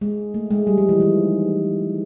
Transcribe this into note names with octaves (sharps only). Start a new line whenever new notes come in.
G#3
A3
G#3
G3
F3
E3
D#3